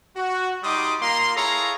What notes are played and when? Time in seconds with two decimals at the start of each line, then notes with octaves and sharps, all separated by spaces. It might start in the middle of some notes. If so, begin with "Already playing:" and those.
0.17 F#4
0.64 G3 D#4 C6 D6 D#6
1.02 A#3 F4 A#5 C6
1.36 E4 G#4 A4 C#5 F5 A#5